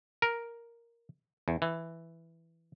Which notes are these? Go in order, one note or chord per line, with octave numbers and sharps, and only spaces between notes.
A#4
E2
E3